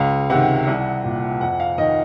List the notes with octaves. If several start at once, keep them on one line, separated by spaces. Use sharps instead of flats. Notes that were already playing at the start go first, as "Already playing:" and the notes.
Already playing: C#2 F5
C3 D#3 F#5
C2
A#2
F2 F#5
F5
D#3 D#5